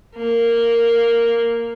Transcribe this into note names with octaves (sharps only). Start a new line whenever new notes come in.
A#3